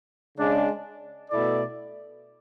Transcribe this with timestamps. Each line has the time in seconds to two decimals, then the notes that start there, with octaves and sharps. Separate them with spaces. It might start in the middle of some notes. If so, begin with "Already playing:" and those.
0.36 C#3 G#3 D4
1.30 B2 A3 E4 A4 D5